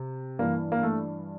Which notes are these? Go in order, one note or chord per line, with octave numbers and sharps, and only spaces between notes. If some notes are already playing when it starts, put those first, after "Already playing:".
Already playing: C3
G2 E3 A#3
A#3
A3